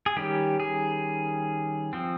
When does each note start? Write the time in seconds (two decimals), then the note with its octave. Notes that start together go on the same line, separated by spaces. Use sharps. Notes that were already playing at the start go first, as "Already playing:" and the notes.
0.06 G#4
0.16 D#3 G3 C#4 G4
0.60 G#4
1.93 F3 C4